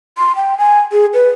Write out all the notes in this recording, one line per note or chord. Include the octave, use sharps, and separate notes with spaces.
C6
G5
G#5
G#4
B4